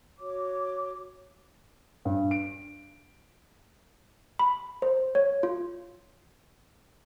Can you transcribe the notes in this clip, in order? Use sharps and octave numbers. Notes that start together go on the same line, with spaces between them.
F#4 C#5 D6
G2
D7
B5
C5
C#5
F4